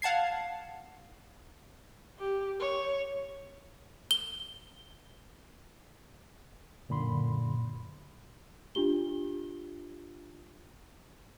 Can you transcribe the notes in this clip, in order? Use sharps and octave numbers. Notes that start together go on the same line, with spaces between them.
F5 F#5 A5 G#6 C7
G4
C#5
G7
F#2 A#2 D3 B5 C6
D4 F4 G4 G7